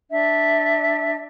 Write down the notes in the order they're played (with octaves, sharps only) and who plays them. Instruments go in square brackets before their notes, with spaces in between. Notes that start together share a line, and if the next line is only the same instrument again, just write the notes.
[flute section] D4 E5